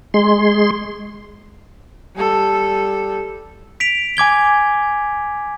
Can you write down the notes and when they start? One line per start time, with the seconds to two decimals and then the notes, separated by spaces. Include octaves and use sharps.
0.14 G#3 C6
2.16 G3 A4
3.80 B6 D7 F7
4.17 G#5 D6 G#6 G7